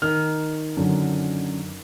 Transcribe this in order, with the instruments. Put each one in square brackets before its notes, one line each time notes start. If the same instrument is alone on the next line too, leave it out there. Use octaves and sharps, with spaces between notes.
[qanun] D#3 [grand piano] F6
[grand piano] F#2 D3